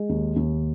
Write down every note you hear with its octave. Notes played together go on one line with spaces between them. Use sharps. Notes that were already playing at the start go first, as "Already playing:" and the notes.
Already playing: G#3
D#2
D#2